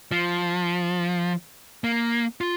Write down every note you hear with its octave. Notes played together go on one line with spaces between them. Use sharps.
F3
A#3
F4